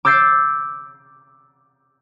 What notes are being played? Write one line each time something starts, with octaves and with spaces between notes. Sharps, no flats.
D6 E6 G6 A6 C7 D7